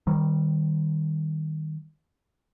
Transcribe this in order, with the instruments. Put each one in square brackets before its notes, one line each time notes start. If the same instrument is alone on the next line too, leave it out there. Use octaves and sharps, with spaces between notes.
[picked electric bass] D#3 G3